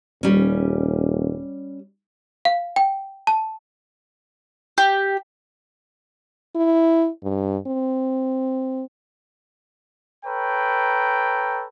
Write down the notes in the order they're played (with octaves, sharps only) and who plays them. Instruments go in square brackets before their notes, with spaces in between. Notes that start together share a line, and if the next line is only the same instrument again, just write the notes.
[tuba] D#1 [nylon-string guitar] G3 C#4
[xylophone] F5
G5
A5
[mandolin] G4
[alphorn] E4
G2
C4
[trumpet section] A4 B4 C#5 G5 A#5